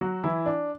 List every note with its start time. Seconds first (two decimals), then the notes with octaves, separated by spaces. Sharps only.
0.01 F#3 F#4
0.24 E3 E4
0.46 D4